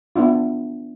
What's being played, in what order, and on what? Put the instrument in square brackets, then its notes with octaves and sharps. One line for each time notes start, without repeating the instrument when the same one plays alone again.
[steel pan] B3 D4 E4 F4